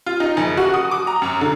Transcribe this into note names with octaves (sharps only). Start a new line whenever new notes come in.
F4
D#4
F#1
F#4
D#6
D6
A#5
F#2
D3